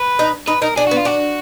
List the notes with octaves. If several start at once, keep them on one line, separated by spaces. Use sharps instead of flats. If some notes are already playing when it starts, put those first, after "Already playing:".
Already playing: B4
D#4
D#4 B4
D#4 A#4
D4 G#4
B3 F#4
F4
D4 F#4